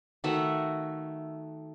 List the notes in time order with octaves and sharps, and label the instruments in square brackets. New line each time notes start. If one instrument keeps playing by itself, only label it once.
[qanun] D#3 A3 F#4 E5